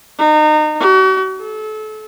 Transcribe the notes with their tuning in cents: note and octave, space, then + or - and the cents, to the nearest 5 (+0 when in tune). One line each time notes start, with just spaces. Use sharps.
D#4 -30
F#4 +40
A4 -30